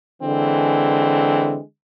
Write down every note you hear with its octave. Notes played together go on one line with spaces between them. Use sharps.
D3 E3 G#3 C4